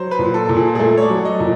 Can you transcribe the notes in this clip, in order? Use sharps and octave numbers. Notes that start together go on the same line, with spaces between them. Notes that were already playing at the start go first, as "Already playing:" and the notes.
Already playing: F#3 C5
B4
A#2
A4
A#2
G#4
G#4
A3 A4
C#5
D5
F#3
D#5
A#2